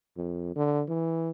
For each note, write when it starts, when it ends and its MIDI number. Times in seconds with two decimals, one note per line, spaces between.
0.17 0.52 41
0.56 0.83 50
0.88 1.30 52